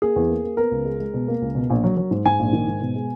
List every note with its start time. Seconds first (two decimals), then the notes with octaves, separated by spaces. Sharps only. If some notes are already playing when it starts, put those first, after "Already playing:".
0.02 A#3 G#4
0.16 E2
0.29 A#3
0.44 A#3
0.57 B3 A#4
0.72 C#2
0.85 G#3
1.00 G#3
1.14 B2
1.28 A#3
1.42 C#2
1.55 B2
1.70 A#1
1.84 F#3
1.97 F#3
2.11 G#2
2.26 G#2 G#5
2.39 A#1
2.53 D#3
2.67 G#2
2.81 B2
2.95 G#3